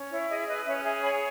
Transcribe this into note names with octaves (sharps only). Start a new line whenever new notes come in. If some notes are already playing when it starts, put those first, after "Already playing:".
Already playing: C#4
E4 C#5
G#4 D#5
B4 D#5
C#4 C#5 E5
G#4 E5 G#5
C#5 G#5 B5